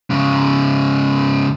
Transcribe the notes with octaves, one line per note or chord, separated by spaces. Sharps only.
G#2 C#3